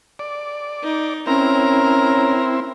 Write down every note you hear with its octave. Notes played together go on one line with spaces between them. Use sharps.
D5
D#4
C4 C#4 E4 A#4 A#5